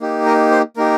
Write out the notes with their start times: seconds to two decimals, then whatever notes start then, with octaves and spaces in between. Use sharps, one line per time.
0.01 A#3 D#4 G4
0.26 A#4 D#5
0.51 C5
0.77 A#3 D#4 G4 A#4